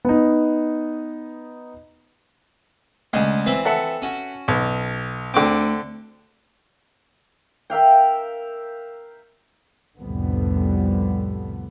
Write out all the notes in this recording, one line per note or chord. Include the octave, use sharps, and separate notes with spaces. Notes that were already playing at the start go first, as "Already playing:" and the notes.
B3 D#4
D2 C#3 G#3
E3 C4 B4
A4 E5 F#5
C#4 F#4
B1
D2 D3 C4 D6
A#4 E5 F5 G5
C2 F2 A2 D3 G3 B3